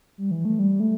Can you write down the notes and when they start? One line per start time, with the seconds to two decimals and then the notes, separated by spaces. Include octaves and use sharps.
0.18 G3
0.31 E3
0.45 A3
0.59 G3
0.80 A3